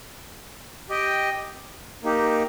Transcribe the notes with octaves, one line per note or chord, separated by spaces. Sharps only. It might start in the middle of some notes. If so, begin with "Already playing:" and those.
G4 D#5 G5
A#3 D#4 G4